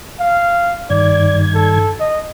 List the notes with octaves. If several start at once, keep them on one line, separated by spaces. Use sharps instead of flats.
F5
G2 D#3 D5 G#6
A4
D#5